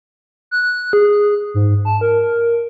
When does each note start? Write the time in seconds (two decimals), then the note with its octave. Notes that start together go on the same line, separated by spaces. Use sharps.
0.51 F#6
0.93 G#4
1.54 G#2
1.85 A5
2.01 A#4